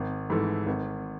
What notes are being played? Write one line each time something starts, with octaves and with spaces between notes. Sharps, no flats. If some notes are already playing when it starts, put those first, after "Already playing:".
Already playing: G#1
G#2 E3 A3
G#1